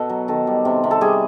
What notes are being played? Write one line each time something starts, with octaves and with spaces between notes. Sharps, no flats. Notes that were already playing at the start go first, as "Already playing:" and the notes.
Already playing: B2 A4
F#3
D#3 A4
G3
C3
C3
A4
G3 G#4